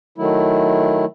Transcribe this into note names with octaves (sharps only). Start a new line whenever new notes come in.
D#3 F#3 A3 E4